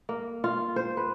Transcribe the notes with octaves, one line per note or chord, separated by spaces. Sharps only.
A#3
F4
C5
B4